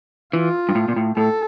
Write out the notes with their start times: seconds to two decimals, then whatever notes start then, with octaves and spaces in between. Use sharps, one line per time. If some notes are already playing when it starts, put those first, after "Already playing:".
0.33 E3 F4
0.69 G2
0.75 A2
0.88 A#2
0.96 A2
1.17 A2 A4